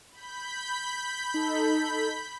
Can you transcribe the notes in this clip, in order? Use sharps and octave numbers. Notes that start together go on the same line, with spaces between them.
B5 G6 B6
D#4 A4